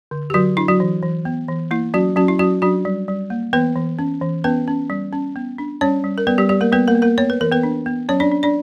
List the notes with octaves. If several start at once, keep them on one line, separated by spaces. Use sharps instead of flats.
D3
G4
D3 F#3 F#4
D4 E4
F#3 F#4
E3
E3
B3
E3
A#3 E4
F#3 C#4 F#4
F#3 C#4 F#4
E4
F#3 C#4 F#4
F#3 D4 F#4
G3
G3
A#3
E3 B3 B4
E3
C#4
E3
B3 C#4 B4
C#4
G3
C#4
B3
D4
G3 C#4 C#5
G3
A#4
G3 B3 B4
G3 G4
G3 G4
A#3 A#4
G3 B3 B4
A#3 A#4
B3
A#3 A#4
B3 C#5
B4
E3 A#4
B3 B4
D4
B3
F#3 C#4 C#5
D4 D5
D4
D4 D5